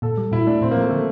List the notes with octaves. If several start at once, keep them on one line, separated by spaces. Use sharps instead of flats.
A#2 A4
G3
A#2 E4
A3 D4
A#2 C4
A#3
F3 A3
D3 A3